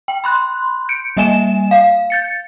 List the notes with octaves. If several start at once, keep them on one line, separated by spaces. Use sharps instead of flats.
G5
B5 C6 F#6
G6 C#7 D7
G3 A#3 D#5 E5 G#5 E7
F5
G6 A6 C#7